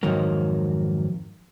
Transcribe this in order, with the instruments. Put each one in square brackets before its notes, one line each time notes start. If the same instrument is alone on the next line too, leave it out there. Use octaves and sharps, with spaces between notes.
[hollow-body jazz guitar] F2 G#2 D#3 F#3 A#3